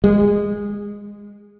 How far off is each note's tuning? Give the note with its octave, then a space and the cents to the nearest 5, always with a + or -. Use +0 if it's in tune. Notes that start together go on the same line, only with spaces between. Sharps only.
G#3 -15